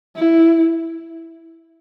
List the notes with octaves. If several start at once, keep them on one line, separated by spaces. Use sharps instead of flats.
E4